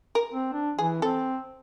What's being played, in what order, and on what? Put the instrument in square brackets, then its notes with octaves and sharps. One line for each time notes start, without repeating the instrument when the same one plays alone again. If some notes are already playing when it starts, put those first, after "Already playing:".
[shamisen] A#4
[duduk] C4
D4
[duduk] E3 [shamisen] G#4
[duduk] C4 [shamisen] A4